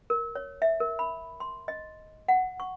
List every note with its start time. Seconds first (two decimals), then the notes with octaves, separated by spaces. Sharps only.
0.10 A#4
0.35 C#5
0.62 E5
0.80 A#4
0.99 B5
1.40 C6
1.68 D#5
2.28 F#5
2.60 C#6